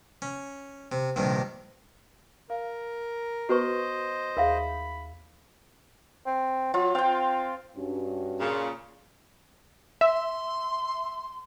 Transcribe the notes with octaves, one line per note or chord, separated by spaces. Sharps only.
C#4
C3
A#1 G2 C3 D#3
A#4 F5
B3 F#4 B4 C5 D#5 C#6
D#2 G#4 A#4 E5 F5 B5
C4
F#3 F4
C4 F5 G5
G2 C#4 F#4
A#2 C#3
E5 C6